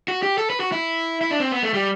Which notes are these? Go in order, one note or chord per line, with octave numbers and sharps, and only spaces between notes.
F#4
G4
A4
B4
F#4
E4
E4
D4
C4
B3
A3
G3